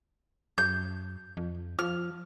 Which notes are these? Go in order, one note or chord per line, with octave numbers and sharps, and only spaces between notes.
F#2 G6
F2
F3 F6